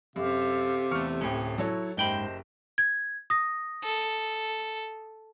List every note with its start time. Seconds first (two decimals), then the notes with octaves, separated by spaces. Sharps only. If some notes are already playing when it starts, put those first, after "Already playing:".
0.16 F#2 C3 G4 A4 F5
0.91 E2 A3 C#6 F6 C#7
1.21 D1 A2 C#4 G5
1.58 F#3 E4 A4 C#5
1.97 F#1 G#2 G4 C5 D#5 G5 A5 B5
2.78 G#6
3.30 D#6 A#6
3.83 A4